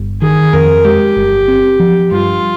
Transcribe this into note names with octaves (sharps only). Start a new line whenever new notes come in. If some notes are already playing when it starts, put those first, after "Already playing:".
Already playing: G1
D#3 G#4
F2 A#4
G#3 G4
G1
C4
F3
G2 F4